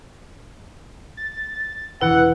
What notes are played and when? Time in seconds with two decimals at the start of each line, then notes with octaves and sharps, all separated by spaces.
1.17 A6
2.01 E1 E3 E4 B4 F#5